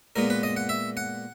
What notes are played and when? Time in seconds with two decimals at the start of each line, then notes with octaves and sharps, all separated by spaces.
0.16 A#2 G#3 B3 A#4
0.30 B4
0.43 D#5
0.56 F#5
0.69 E5
0.97 F#5